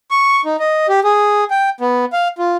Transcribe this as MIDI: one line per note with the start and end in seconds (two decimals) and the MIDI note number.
0.11 0.41 85
0.45 0.56 63
0.59 0.87 75
0.88 1.00 67
1.04 1.44 68
1.50 1.70 79
1.81 2.05 59
2.13 2.28 77
2.38 2.57 65